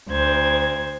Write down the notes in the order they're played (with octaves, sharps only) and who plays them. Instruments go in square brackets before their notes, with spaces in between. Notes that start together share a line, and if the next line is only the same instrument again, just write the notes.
[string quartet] D2 C5 G#6